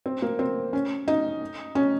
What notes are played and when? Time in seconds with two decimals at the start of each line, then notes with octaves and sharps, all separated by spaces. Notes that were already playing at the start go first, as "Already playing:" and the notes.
0.06 C4
0.22 A#3
0.39 C4
0.73 C#4
1.08 D#4
1.75 C#4